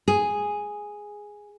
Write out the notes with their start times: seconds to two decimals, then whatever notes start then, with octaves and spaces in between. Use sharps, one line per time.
0.08 G#4